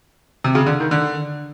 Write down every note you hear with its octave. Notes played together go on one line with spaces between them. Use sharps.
C3
C#3
D3
D#3
D3